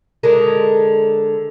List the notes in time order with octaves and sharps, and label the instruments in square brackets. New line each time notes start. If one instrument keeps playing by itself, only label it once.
[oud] D3 G#3 A#4